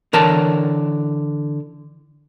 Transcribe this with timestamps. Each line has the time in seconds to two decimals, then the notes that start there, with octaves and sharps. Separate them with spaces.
0.13 D3 E3 A#4 C#5 A5